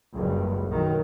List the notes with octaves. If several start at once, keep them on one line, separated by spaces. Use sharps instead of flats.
F#1 C#2 G2
B1 D#3 F#3